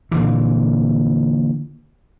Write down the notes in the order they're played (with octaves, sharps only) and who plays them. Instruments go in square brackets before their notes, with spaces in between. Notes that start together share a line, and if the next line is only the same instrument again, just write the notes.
[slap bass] A#2 D3 E3